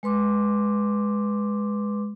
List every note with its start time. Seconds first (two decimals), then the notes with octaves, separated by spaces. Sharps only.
0.03 G#3 B4 C6 D6